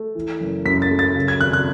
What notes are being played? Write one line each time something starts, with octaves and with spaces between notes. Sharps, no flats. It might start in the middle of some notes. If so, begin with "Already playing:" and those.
Already playing: A3
E3
F#1
F#2 B6
A6
A3
A6
C#3
G#6
G#1 F#6
F#6